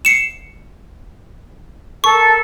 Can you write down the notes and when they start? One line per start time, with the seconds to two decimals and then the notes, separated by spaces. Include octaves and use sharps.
0.05 C7 C#7 E7
2.04 A4 A#4 C#6